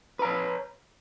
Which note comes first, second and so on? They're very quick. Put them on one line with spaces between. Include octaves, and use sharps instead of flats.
B4 A#5 C#5